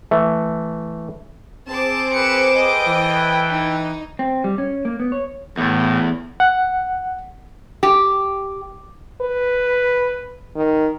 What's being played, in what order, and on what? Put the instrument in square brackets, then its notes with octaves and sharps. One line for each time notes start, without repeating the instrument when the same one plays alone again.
[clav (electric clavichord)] E3 A3
[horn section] C4 [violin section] G#4 C5 D6 [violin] A5
[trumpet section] A#4 B4 [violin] C#7 E7
[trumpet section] A4 B4 G5 [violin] D#5
[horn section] E3
[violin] D#4
[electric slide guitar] C4
G3
C#4
A#3
B3
C#5
[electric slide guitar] E2 [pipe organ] A2
[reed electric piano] F#5
[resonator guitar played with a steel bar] G4
[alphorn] B4
D#3